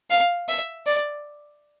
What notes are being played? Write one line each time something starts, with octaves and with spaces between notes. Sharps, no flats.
F5
E5
D5